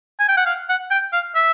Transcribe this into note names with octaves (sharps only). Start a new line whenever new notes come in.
G#5
G5
F#5
F5
F#5
G5
F5
E5